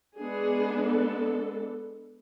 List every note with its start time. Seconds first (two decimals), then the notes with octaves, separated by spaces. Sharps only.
0.18 G#3 B3 D4 G#4
0.86 A4